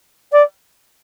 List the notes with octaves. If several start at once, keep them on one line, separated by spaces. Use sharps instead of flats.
D5